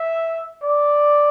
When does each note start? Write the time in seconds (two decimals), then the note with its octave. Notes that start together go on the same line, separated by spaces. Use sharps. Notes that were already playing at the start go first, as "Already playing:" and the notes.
Already playing: E5
0.62 D5